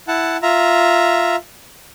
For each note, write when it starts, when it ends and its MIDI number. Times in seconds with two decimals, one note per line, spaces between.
0.08 0.37 64
0.08 0.37 78
0.08 0.37 81
0.42 1.36 65
0.42 1.36 76
0.42 1.36 82